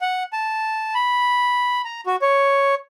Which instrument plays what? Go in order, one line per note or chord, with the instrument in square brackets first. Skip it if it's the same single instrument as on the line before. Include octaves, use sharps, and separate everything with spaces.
[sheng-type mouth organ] F#5
A5
B5
A#5
F#4
C#5